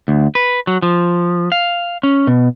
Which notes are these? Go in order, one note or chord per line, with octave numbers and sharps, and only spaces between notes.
D2
B4
F#3
F3
F5
C#4
B2